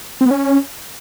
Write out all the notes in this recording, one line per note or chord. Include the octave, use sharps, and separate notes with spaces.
C4
B3
C#4